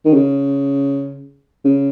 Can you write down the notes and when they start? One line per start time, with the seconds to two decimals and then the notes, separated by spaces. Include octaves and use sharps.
0.05 D#3
0.13 C#3
1.65 C#3